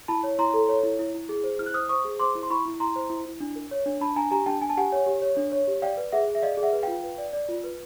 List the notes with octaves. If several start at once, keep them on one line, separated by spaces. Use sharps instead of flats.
E4 A5 B5
C#5
E4 A#5 C6
A4
C#5
E4
E4
E4
G#4
C5
E4 F6
F#6
C5 D#6 F6
C5 C#6 D#6
G#4
C5 C6 D6
E4
C6
E4 B5 C#6
E4
E4 A#5 C6
C5
E4
E4
D4
A#4
C#5
D4
D4 A5 B5
D4 G#5 A#5
G4 G#5 A#5
D4 G5 A5
D4 G#5
A5
G4 F#5 G#5
C#5
G4
C#5
D4
C#5
G4
D5 F5 G5
B4
G#4 E5 F#5
G#4
E5
D5 D#5 F5
G#4
E5 F#5
B4
F4 F5 G5
B4
D5
D5
F4
B4